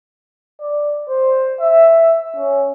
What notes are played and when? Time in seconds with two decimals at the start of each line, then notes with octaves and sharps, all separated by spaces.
0.61 D5
1.09 C5
1.60 E5
2.36 C#4